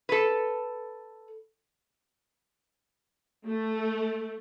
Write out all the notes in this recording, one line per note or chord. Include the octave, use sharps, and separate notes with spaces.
A4 B4
A3